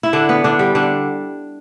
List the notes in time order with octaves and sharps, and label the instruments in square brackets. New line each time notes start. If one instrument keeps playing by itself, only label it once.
[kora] E4
D3 D4
B3
D3 D4
G3
D3 D4